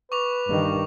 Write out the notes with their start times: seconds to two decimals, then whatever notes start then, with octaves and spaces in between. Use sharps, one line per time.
0.12 B4 C#6 D6 F7
0.48 G2 D#3